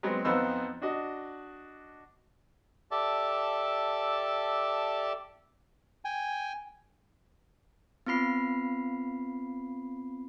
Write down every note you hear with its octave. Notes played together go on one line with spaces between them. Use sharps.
F#3 G#3 B3 C4
F2 B3 C4 D#4 C6 E6
D4 F#4 D#5
G4 A4 D5 E5 A5
G5 G#5
B3 C4 F4 B5 C7